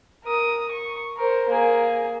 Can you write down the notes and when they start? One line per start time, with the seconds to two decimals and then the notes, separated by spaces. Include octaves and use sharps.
0.24 A#4 D#6
0.71 C#6
1.17 A#4 C5
1.49 A#3 G#4